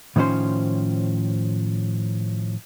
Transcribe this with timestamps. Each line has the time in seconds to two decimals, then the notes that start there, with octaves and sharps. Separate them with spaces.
0.16 A2 D#3 F3 A3 C#4 C5